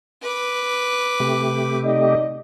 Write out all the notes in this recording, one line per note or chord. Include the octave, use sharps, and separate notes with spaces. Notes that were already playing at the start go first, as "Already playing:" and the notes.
B4 D6
C3 A3 G4
D#4 D5 D#5